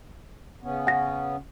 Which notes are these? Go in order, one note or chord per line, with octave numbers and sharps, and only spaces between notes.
C#3 B3 C#4
F#5 A#6